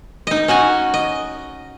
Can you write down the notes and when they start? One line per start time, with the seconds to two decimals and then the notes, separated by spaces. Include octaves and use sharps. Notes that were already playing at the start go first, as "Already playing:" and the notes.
0.27 D#4 D#5
0.48 C#4 F#4 F#5 G#5
0.94 D#5